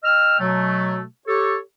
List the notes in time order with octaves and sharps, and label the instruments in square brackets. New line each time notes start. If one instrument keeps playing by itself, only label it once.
[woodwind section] D#5 G5 E6 F6
B2 F#3 A3
G4 A4 C#5